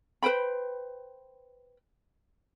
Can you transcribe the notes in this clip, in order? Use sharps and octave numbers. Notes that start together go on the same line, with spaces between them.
B4 C5 G5 B5